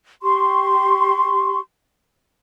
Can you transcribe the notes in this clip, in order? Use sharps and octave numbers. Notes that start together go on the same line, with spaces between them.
G4 C6 C#6